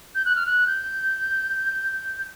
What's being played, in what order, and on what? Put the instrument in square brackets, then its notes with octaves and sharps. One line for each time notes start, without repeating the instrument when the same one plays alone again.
[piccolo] G6
F#6
F6
F#6
G6